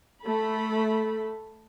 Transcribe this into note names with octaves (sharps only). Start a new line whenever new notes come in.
A3 A4 B5